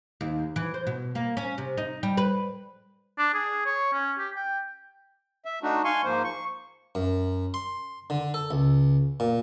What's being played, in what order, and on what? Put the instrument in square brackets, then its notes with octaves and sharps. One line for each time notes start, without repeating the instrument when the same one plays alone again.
[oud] D#2
E3
C5
B2
A#3
C#4
C3
D#4
G3
B4
[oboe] D4
G#4
C#5
C#4
G4
G5
[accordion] E5
A3 D4 D#4 F#4
F5 G#5 C6 C#6
G#2 F3 A#3 C5
C#6
[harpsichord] F#2
C6
D3
A4
C#2
A#2